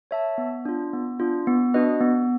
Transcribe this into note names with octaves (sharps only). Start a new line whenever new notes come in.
C#5 E5 A5
B3
D4 F4
B3
D4 F4
B3
D4 F#4 B4 D#5
B3